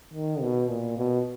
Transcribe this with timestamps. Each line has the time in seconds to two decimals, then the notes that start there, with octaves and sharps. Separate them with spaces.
0.13 D#3
0.42 B2
0.69 A#2
0.97 B2